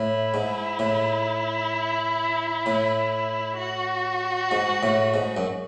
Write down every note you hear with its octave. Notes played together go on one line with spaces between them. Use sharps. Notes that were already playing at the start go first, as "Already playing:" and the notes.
Already playing: A2 E4
G#2
A2
A2
F#4
G#2
A2
G#2
F#2